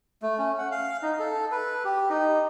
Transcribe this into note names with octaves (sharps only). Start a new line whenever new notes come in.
A3
C#4
F#5
F5
D#4
A4
B4
G4
D#4